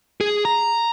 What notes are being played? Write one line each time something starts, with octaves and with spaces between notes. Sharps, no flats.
G#4
A#5